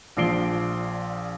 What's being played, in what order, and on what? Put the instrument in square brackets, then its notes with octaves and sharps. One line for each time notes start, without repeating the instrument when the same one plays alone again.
[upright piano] A#1 A#2 F3 C7 D7 G7